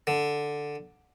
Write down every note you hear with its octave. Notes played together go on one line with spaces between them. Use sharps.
D3